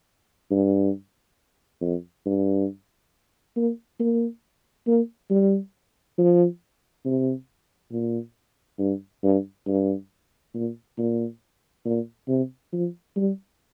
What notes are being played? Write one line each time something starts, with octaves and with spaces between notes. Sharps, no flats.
G2
F2
G2
A#3
A#3
A#3
G3
F3
C3
A#2
G2
G2
G2
A#2
A#2
A#2
C3
F3
G3